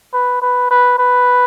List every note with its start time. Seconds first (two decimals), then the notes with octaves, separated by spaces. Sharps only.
0.13 B4
0.42 B4
0.71 B4
0.99 B4